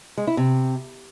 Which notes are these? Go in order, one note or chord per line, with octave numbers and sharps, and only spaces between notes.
G#3
E4
C3